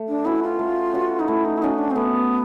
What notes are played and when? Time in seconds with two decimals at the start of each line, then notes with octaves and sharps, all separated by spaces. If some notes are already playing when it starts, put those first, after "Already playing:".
Already playing: A3
0.08 D4
0.25 C#4 E4 F#4 B4
0.42 F4
0.59 A3
0.93 C#4 F#4 B4
1.19 D#4
1.27 A3 E4
1.44 D#4
1.57 E4
1.61 C#4 D#4 F#4 B4
1.78 D4
1.90 C4
1.96 A3 B3